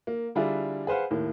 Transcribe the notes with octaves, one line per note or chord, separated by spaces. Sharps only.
A#3
D3 G3 D4 E4 F4 G#4
G#4 B4 C5 F5 F#5
D#2 A2 A#3